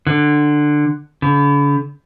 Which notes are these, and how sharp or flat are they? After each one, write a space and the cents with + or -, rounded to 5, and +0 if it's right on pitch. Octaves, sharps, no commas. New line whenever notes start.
D3 +15
D3 -45